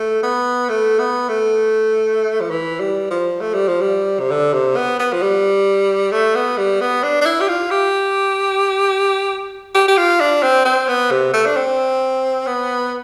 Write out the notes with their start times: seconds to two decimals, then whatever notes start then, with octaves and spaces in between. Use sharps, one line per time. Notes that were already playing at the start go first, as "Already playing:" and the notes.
Already playing: A3
0.23 B3
0.69 A3
0.99 B3
1.29 A3
2.40 F3
2.50 E3
2.80 G3
3.10 F3
3.40 A3
3.54 G3
3.68 F3
3.81 G3
4.20 C3
4.31 D3
4.53 C3
4.76 B3
4.99 B3
5.13 F3
5.22 G3
6.12 A3
6.35 B3
6.57 G3
6.81 B3
7.03 D4
7.21 D4
7.25 E4
7.40 G4
7.48 F4
7.71 G4
9.74 G4
9.88 G4
9.97 F4
10.20 D4
10.43 C4
10.65 C4
10.88 B3
11.11 C3
11.33 A3
11.46 D4
11.56 C4
12.47 B3